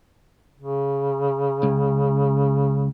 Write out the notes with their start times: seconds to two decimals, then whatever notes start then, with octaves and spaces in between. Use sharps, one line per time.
0.59 C#3
1.63 C#2